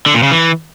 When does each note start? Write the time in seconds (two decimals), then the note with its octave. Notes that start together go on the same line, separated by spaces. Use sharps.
0.06 D3
0.15 A#2
0.23 C#3
0.31 E3